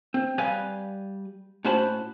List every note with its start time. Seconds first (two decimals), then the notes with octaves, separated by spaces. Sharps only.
0.14 C4
0.38 G3 B4 F5 G#5
1.65 A2 C#4 F#4 C5 A5 B5